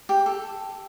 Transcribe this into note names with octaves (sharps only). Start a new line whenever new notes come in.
G4
A4